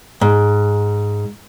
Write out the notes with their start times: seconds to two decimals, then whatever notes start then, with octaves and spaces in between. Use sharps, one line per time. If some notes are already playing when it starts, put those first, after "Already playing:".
0.21 G#2